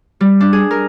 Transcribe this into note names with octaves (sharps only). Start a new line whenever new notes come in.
G3
D4
G#4
A#4